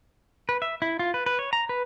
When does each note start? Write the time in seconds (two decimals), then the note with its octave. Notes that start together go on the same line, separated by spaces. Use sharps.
0.49 B4
0.62 E5
0.82 E4
0.99 F4
1.14 B4
1.26 B4
1.39 C#5
1.53 A#5
1.69 B4